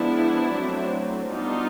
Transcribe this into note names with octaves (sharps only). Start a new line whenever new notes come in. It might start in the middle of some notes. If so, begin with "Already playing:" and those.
Already playing: F3 G#3 B3 D4 E4
F#3 A3 C4
G3 B3 D4 D#4 F4